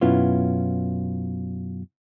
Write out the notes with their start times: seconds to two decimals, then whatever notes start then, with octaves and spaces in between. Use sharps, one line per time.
0.01 F#2 B2 B3 C#4 E4 F4